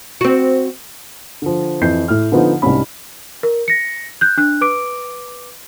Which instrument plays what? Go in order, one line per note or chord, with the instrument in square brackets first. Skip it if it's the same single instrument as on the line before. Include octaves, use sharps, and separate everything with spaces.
[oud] C4 F#4
[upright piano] D3 F3
F2 E3 G6 C7
A2 F6
D3 F3 B3 D#4 F4 C5
C2 G#2 C3 C#4 B5
[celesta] A#4
A#6 C#7
F#6 G6
D4 F#6
B4 D6 D7